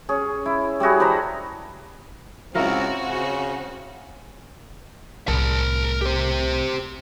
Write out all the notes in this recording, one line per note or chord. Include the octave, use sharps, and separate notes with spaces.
C#4 G#4
E4
G3 E4 F#4 G#4
D4 B4 C5 A#5
C#2 C4 E4 F#4 A#4 C#5 F5
C#3
C2 A2 A#4 A5
G4 C5